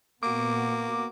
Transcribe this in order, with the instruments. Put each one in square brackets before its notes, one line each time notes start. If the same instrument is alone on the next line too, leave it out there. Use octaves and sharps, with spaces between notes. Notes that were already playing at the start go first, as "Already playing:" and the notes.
[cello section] A#2 B3 F#4 [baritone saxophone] A#3 [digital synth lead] D6